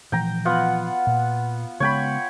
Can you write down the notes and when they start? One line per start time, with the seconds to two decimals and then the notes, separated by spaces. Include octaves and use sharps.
0.12 A#2 E3 F3 G5 A#5
0.45 B3 F4 F#5
1.07 A#2
1.80 C#3 G#3 B3 C#5 G5 B5